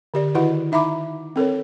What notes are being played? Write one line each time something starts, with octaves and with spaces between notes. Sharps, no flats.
D3 G4 D5
D#3 E4 F#4 B4 D#5 F#5
D#4 E5 A#5 B5 D6
C4 A4 A#4 C#5